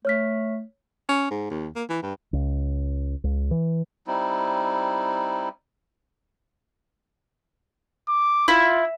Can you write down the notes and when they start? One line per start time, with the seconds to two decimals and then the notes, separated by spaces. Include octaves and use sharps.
0.05 A3 C#5 F6 B6
1.09 C#4
1.30 G#2
1.50 D#2
1.75 A#3
1.89 E3
2.02 G2
2.33 C#2
3.24 C#2
3.51 E3
4.07 G3 C4 D#4 E4
8.08 D6
8.48 E4 F4